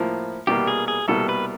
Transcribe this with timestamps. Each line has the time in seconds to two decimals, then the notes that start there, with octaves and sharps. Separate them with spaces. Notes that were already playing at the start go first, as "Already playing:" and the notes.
Already playing: A2 F3 A#3
0.47 C2 B2 G3 A#3 G4
0.67 G#4
0.88 G#4
1.08 C2 B2 G3 A#3 A4
1.29 B4